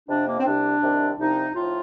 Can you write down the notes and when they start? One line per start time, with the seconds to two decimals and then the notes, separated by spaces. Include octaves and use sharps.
0.08 F2 C3 F3 D4
0.27 A#3
0.40 C4
0.45 C2 C3 G3 D4
0.82 C2 C3 D#3 G3
1.18 C2 C3 F3 D#4
1.54 A2 F3 F4